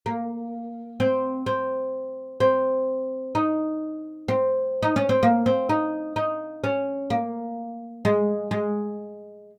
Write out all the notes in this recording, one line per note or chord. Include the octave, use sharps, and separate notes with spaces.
A#3
C4
C4
C4
D#4
C4
D#4
C#4
C4
A#3
C4
D#4
D#4
C#4
A#3
G#3
G#3